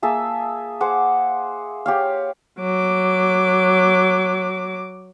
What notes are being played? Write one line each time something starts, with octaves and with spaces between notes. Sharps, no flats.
A#3 G#4 E5 A5
G#4 C5 F#5 D6
G4 C#5 F5
F#3 D6